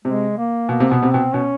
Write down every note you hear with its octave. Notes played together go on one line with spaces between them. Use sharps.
C3 G#3
A#3
B2 A#3
C3
B2 B3
C3
B2 C4
B2 C#4